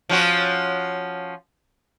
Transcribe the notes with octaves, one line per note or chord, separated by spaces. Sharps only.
F3 C#4 F#4